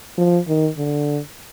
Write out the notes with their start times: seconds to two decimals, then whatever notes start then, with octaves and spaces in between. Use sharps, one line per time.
0.18 F3
0.48 D#3
0.77 D3